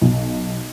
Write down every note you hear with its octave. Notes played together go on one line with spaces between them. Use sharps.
B1